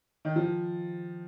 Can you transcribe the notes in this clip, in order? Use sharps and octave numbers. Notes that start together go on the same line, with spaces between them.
D#3
F3